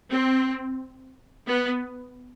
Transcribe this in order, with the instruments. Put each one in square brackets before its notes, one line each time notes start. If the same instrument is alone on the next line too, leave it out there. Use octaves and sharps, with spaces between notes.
[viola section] C4
B3